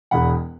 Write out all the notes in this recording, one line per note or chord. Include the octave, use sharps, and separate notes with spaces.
E1 E2 B2 F#5 B5